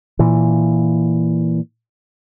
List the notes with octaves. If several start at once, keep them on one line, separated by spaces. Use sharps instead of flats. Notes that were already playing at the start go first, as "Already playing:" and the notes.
A#2 E3